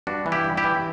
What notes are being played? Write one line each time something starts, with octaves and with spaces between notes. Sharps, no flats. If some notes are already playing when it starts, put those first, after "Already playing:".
G2 D4 F#4
E3
E4 G4
G2
E4 G4
E3